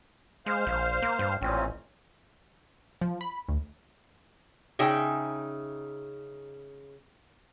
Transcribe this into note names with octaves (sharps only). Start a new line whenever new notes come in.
G#3 C5 F5
A#1
A#3
G2
A1 A#2 C4 C#4
F3
B5
D2
C#3 D#4 G#4 E5 G5